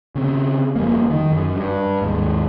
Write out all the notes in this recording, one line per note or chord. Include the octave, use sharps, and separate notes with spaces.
C#3 C4
F2 G3 A#3
D#3
F#2
G2
D#2 G#2